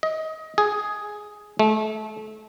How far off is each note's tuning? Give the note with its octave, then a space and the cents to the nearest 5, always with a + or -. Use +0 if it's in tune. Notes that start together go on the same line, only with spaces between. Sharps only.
D#5 +25
G#4 +5
A3 -30